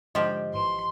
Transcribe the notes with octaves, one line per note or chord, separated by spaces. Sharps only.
G#2 D3 F3 G4 D#5
G#1 E3 C6